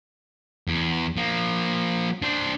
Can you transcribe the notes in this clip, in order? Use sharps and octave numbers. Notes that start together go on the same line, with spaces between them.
E2
F3 A#3
D4 C5